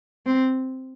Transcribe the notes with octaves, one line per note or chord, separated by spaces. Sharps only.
C4